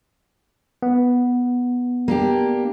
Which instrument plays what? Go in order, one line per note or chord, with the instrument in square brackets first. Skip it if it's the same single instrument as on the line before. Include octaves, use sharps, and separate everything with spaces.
[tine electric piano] B3
[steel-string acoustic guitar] A#3 D4 G4